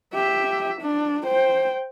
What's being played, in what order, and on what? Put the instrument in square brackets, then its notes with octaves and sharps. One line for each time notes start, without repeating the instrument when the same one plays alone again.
[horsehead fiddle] G4 E5
D4
C5 G5